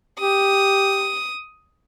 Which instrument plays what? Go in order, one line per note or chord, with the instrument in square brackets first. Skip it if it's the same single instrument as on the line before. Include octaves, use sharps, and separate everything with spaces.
[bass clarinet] G4 [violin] D#6